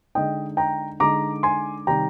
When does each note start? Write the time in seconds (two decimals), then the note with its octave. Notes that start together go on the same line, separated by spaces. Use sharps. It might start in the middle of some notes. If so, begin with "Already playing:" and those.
0.15 D3 G#3 D#4 D#5 G5
0.57 G5 A#5
1.00 D3 G#3 D#4 A#5 D6
1.43 G#5 C6
1.87 C3 D#3 G3 G5 A#5